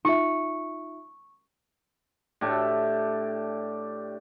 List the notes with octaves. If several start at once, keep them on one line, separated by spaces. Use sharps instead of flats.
D#4 F4 E5 C#6
A2 D4 G4 A4